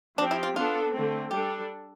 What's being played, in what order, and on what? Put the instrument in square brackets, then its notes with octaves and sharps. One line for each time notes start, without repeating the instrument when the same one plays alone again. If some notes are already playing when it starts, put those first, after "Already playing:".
[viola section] F3 C4 G4 [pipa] D4
[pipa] E4
F4
[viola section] B3 D4 A4 [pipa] F4
[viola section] D3 A3 C4
[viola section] G3 D4 A4 [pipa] G4